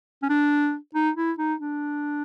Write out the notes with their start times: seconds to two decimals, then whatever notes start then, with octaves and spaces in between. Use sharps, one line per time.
0.23 C#4
0.29 D4
0.95 D#4
1.16 E4
1.38 D#4
1.60 D4